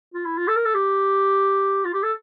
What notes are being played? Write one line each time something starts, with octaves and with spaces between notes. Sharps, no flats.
F4
E4
F4
A4
A#4
A4
G4
F4
G4
A4